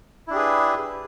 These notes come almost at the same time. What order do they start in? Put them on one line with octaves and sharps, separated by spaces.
E4 D4 G4 G#4 B4